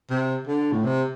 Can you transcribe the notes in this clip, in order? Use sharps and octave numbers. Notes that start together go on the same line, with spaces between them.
C3
D3
A2
C3